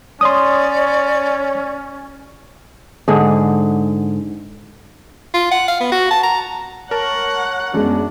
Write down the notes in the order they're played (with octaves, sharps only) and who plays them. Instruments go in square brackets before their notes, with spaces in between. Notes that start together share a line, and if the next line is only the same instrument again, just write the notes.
[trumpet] C#4 [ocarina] C#5 [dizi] D5 [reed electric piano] C6 D#6
[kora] G#2 D3 G#4
[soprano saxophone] F4
F#5
F5
B3
F#4
A5
A#5
[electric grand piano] A#4 A5 [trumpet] C#5 [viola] F#5
[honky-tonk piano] F#2 G#3 B3 [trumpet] D4